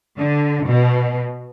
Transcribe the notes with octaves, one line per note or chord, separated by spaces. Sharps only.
D3
B2